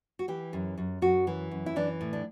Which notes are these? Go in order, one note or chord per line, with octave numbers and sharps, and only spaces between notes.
F#4
E3 G4
F#2
F#2
F#2 F#4
E3
F#2
E4
E3 D4
A2
D4